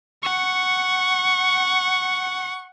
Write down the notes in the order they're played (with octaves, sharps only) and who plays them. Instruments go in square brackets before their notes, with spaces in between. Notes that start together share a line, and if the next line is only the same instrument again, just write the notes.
[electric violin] F#5 [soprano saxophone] C#6